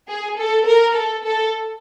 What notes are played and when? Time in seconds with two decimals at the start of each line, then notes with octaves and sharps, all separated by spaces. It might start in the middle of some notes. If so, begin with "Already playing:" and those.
0.08 G#4
0.38 A4
0.66 A#4
0.95 A4
1.24 A4